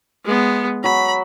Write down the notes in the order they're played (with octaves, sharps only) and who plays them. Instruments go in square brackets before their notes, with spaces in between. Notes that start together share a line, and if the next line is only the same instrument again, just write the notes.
[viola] G#3 B3
[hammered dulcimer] F#3 [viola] B5